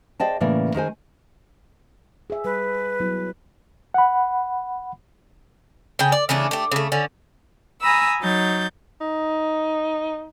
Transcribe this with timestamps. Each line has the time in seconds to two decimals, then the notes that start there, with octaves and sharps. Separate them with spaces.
0.20 G#4 C5 D5 D#5 G5 A5
0.40 A2 C#3 E3 A#3 D5 G#5
0.74 D#3 G#3 C5 G#5
2.30 G#4 E5
2.44 G3 B4
3.00 F#3 B3 E4
3.94 F#5 B5
5.99 C#3 G#4 G5
6.12 D5
6.29 C#3 E3 A3 D4
6.51 A3 G4
6.72 C#3 A3
6.92 D3 C#4
7.81 G#5 A#5 B5 D#6 E6
8.21 F#3 D#4 G6 A6
9.01 D#4